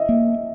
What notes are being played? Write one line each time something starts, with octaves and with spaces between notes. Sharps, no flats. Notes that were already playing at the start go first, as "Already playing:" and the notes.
Already playing: D#5 E5
A#3